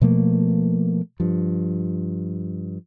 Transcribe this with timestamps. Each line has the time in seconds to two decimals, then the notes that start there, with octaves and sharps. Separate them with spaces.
0.02 B2 F3 A3 A#3
1.20 G2 F3